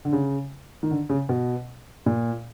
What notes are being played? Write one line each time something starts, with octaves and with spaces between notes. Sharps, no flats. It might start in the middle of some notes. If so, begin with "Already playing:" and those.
D3
C#3
D#3
D3
C#3
B2
A#2